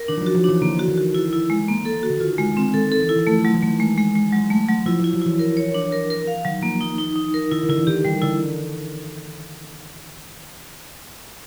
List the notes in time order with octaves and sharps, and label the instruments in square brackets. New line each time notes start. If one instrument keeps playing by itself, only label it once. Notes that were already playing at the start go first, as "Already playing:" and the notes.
Already playing: [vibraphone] A#4
[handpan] D#3 [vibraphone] D4
[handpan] F3
F#3
[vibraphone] F#4
[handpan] F3
[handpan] E3 [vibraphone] D4
[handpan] D3 [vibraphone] A#3
[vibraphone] F#4
[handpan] D#3
[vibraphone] F#4
E4
E4
G#3
A#3
A4
F#4
[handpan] D3
[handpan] D#3 [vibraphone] F4
[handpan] D3 [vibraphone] G#3
[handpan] D#3 [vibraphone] C4
[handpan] D#3 [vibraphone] A4
[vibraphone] A4
[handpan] E3
[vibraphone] E4
[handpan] E3
[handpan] F3 [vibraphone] A3
[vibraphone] F#3
[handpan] E3
[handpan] D#3 [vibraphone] A3
[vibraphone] G#3
G#3
G#3
F#3
A3
F#3
[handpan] F3 [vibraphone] E4
[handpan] F3
[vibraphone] E4
[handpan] F#3
[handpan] E3 [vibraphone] E4
[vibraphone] A#4
C#5
D4
A#4
A#4
F5
[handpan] D#3 [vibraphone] F#3
[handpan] F3 [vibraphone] A#3
[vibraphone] D#4
D#4
D#4
A#4
[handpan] D#3 [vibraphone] E4
[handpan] D#3
[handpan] D3 [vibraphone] E4
[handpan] E3
[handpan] D#3 [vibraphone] G4
[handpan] D#3 [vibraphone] G3
[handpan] D3 [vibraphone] E4